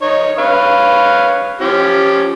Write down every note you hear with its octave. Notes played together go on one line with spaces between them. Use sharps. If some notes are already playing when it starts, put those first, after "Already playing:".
D#4 C#5
B4 C#5 F5
F3 C#4 G4